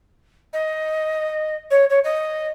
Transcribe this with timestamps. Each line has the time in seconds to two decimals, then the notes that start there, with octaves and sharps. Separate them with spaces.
0.53 D#5
1.71 C#5
1.90 C#5
2.04 D#5